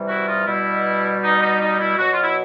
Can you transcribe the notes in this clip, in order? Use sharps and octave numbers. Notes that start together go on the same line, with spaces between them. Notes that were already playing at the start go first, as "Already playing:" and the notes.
Already playing: C3 E3 G3
E4 F#4
D#4 F4
B2 G3 E4
D#4
D#4
D#4
E4
B2 F#3 F#4
F4
E4